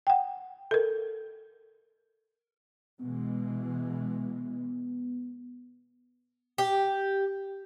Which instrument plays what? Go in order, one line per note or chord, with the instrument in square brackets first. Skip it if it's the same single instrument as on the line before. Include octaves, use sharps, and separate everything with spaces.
[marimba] F#5 G5
A4 A#4
[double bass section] B2 E3 G#3 [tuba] B3
[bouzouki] G4